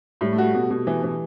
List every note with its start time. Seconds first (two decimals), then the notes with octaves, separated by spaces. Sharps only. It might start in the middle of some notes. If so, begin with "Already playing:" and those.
0.21 A2 G3
0.33 A3
0.38 G3 F#4
0.54 B2 A3
0.70 B2
0.87 E3
1.04 E3